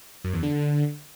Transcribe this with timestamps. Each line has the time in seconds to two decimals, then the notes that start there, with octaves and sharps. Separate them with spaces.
0.24 F#2
0.34 E2
0.43 D3